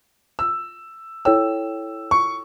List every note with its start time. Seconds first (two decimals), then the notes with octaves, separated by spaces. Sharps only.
0.39 E6
1.25 E4 A4 C#5 G5 E6
2.11 C#6